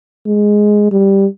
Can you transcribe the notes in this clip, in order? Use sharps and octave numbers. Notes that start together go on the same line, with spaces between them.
G#3
G3